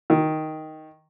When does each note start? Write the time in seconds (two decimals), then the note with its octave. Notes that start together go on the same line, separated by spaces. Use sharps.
0.10 D#3